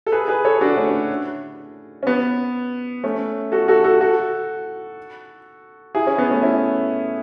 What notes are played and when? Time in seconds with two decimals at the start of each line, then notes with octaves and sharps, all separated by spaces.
0.07 A4
0.12 G#4 B4
0.28 G#4 B4
0.45 A4 C#5
0.61 D4 F#4
0.77 A3 C#4
2.03 C#4
2.07 B3
3.03 A3 C#4
3.52 F#4 A4
3.68 F#4 A4
3.84 F#4 A4
4.01 F#4 A4
5.95 E4 G#4
6.06 C#4 E4
6.18 B3
6.31 A3 C#4
6.43 C#4 E4